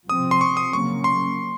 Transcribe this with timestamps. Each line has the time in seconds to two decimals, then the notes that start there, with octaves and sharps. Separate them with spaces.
0.10 C3 F3 C4 D#6
0.31 C6
0.41 C#6
0.57 D#6
0.73 C#3 F#3 A#3 C#4 C#6
1.04 C6